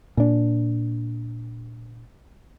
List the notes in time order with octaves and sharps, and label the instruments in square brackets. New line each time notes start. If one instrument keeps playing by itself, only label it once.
[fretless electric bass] A#2 D4